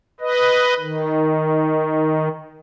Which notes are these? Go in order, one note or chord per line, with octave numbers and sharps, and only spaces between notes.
B4 D#5
D#3